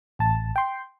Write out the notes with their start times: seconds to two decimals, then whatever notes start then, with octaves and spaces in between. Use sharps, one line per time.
0.19 A1 A5
0.56 G5 C6